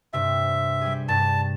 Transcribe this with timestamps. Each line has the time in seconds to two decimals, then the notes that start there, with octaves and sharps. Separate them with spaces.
0.13 G2 C3 E5
0.81 G3 G4 G#4
1.08 G2 A5